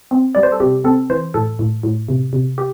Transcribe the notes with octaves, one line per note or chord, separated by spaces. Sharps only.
C4
G3 D5
C5
A4
C3 G4
C4 A4
E3 C5
A2 A4
A2
A2
C3
C3
G4